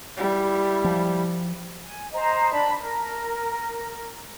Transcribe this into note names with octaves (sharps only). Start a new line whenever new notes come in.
G3 E4
F3
G#5
C5 D#5 A#5
D4 A5 B5
A#4